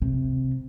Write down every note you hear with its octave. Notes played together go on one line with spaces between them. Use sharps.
C3